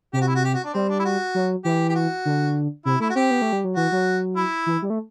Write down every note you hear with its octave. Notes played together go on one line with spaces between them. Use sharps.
C3 G4
F#4
E4
F#4
G4
F#4
D4
G3 C4
D4
E4
F#4
F#3
E3 G4
G4
F#4
D3
C3 E4
A3 E4
F#4
C4 G4
B3
A3
G3
F#3
E3 F#4
F#3
E4
E3
G3
A3